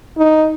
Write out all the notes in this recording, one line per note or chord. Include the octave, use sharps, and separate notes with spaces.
D#4